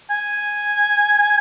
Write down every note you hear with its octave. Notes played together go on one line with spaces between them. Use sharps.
G#5